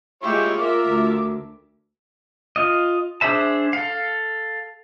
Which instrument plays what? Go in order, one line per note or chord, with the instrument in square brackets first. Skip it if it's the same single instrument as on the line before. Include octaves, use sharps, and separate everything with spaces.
[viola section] G#3 E4 [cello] A#3 [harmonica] F4 C#5 [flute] G4
[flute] F4 [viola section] A#4 E5 [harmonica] D6
[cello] D2
[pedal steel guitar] F4 D#5
D4 G#4 C5 E5 A5
A4 F5